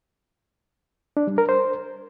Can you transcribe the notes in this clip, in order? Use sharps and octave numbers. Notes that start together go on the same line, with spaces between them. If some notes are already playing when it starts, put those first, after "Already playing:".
D4
G3
A#4
C5